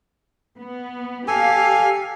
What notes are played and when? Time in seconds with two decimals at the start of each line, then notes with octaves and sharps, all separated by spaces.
0.58 B3
1.28 G4 A4 F5 G#5